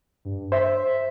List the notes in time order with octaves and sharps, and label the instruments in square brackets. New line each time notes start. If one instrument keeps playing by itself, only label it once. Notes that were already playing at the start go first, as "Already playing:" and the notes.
[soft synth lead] G2
[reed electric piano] C5 [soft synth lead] E5